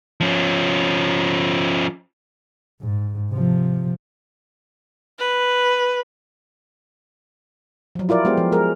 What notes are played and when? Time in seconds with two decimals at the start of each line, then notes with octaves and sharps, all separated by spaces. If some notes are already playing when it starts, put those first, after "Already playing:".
0.21 F3 C#4
2.81 G#2
3.32 C3 F3
5.19 B4
7.95 F3 F#3
8.09 E4 F4 A#4 D5
8.25 G#3 B3 G4 C5
8.37 F3
8.52 G#3 G#4 A#4